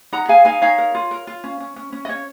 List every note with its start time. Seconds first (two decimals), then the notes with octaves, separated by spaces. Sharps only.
0.12 D#4 F#5 A#5
0.29 G#4 F5 G#5
0.45 D#4 F5 G#5
0.62 D#4 C#5 F5
0.78 A#4
0.95 F4
1.11 A#4
1.27 F4
1.44 C#4
1.60 C#4
1.76 C#4
1.92 C#4
2.05 D#5
2.09 C#4 C#5